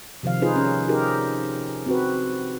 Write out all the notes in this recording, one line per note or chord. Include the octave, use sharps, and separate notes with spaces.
C3 D#3 F3 F5
D#4 F4 G#4 B4 C5
C#4
D#4 G4 G#4 A#4
C4 F#4 B4